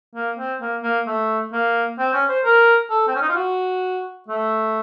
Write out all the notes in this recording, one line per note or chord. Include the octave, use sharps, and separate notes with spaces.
A#3
C4
A#3
A#3
A3
A#3
C4
C#4
C5
A#4
A4
C4
C#4
D#4
F4
F#4
A3